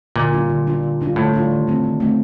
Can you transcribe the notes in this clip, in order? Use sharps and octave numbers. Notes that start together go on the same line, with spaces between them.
A#2 D3
G3 D4 F4
D3
G3 D4 F4
D3
G3 D4 F4
A2 D3
G3 D4 F4
D#3
A3 C4
D#3
A3 C4